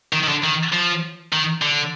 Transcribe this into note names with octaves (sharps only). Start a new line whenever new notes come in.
D#3
D#3
D3
D#3
F3
D#3
D3